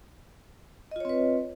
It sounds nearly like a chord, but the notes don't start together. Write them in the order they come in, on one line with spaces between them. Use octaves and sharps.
D#5 F4 C#5 C4 B4